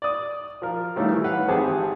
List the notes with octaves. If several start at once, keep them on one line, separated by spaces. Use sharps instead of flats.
D5 D#6
F3 A#4
D#3 F3 G3 A3 C#4
E3
B4 F5 F#5
G#1 C4 G4 G#4 A5